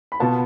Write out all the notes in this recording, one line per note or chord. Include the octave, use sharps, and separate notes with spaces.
B5
B2 B3 F4 A5